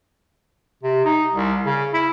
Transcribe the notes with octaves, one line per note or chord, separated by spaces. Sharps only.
C3
D#4
C2
C#3
E4